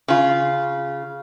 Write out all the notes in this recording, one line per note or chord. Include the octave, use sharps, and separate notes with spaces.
C#3 F4